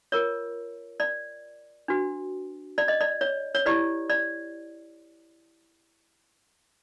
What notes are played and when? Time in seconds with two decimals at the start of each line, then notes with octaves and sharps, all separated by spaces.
0.12 F4 A#4 C#5
1.00 D5
1.88 D4 F#4 B4
2.78 D5
2.88 D#5
3.01 D5
3.21 C#5
3.55 C#5
3.66 E4 G4 B4 D5
4.10 D5